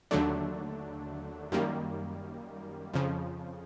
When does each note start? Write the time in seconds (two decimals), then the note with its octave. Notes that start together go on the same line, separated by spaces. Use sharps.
0.11 D#2 D3 F#3 A3 D4
1.52 F#2 D#3 G3 A#3
2.94 F2 C#3 F3